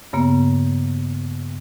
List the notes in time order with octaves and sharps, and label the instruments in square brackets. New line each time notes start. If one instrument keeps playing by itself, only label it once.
[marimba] G2 C#3 A#3 B3